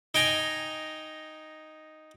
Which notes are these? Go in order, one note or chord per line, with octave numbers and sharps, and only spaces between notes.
D#4 G5 G#5 A#5